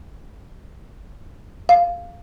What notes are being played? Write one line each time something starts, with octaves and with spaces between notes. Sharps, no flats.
F5